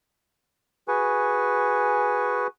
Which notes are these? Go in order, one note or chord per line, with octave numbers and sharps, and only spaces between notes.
F#4 G#4 B4 G#5 C#6